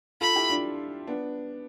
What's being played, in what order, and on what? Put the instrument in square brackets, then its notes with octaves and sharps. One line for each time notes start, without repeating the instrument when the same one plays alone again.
[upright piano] F4 A4 [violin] B5
[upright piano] E4 G4
D4 F4
B3 D4